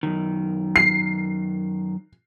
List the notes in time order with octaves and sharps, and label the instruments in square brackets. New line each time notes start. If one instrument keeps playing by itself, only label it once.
[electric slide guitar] F#2 D#3
[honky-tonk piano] C7